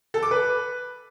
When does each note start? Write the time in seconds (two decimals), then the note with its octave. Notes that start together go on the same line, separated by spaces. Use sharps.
0.14 A4
0.23 D6
0.31 B4